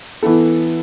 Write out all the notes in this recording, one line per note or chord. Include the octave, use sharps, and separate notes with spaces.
E3 B3 E4 A4